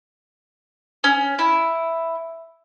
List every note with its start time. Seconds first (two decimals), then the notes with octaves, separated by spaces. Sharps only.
1.04 C#4
1.39 E4